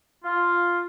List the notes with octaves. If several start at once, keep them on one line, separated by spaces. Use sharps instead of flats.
F4